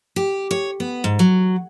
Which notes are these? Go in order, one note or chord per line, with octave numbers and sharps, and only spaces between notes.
G4
C#5
B3
G#2
F#3